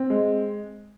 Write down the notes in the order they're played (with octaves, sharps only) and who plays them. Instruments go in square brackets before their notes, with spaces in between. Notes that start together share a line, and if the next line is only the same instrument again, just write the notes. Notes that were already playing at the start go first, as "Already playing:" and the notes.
Already playing: [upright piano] C4
G#3